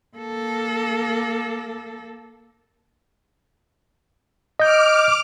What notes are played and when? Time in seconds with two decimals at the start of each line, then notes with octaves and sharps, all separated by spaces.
0.17 A#3 A4
4.60 D#5 D6 F6 G6